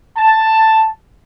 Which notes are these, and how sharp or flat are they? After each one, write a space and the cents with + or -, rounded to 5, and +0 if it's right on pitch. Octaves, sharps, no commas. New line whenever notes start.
A5 +5